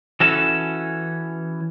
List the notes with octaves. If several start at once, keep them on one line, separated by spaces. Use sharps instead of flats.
E3 C#4 F#4 A4